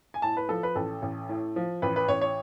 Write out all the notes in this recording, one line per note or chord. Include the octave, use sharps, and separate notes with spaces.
G#5
A2 A5
B4
F3 A4
B4
A1 A4
A1
A2
F3
A1 B4
B4
A1 C#5
C#5